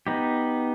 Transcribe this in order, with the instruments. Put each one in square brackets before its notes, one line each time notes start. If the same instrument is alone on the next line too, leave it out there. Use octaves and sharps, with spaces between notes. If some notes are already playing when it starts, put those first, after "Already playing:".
[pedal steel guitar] B3 D#4 G4